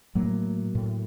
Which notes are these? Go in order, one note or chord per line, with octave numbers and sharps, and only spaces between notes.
A2 F#3 A#3
A2